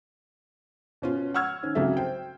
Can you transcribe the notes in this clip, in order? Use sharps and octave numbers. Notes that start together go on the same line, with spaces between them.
B2 C#4 F4
F#5 C#6 E6 F6 G#6
D#3 C#4
C2 C#3 F#3 A4 E5
C5 G5